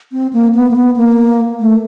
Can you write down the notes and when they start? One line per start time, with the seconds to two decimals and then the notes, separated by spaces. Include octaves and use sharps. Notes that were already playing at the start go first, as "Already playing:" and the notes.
0.13 C4
0.33 A#3
0.55 B3
0.71 A#3
0.76 B3
0.96 A#3
1.60 A3